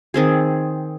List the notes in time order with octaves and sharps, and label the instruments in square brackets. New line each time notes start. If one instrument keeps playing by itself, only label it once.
[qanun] D#3 C4 G#4